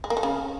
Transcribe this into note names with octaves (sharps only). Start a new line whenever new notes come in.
G#3
A#3
A3
C#3